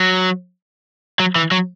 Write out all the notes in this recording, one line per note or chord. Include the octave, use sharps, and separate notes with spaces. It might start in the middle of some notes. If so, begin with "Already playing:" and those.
Already playing: F#3
F#3
E3
F#3